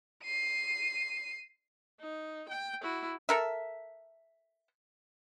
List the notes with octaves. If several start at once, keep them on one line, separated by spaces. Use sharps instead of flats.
C7 D#7
D#4
G5
E4 F#4
A4 A#4 E5